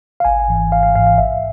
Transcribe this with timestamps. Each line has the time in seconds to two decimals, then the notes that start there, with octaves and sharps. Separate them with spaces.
0.20 F5
0.25 G#1 G#5
0.48 G#2 E3
0.72 G#1 F5
0.83 F5
0.95 G#2 F5
1.00 E3
1.07 F5
1.18 A1 E5